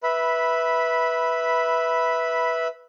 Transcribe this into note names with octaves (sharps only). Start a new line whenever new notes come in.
B4 E5 B5